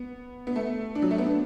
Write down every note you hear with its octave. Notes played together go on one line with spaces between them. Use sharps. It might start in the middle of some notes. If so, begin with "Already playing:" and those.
Already playing: B3
B3
A3
D4
F#3
A3
B3
D4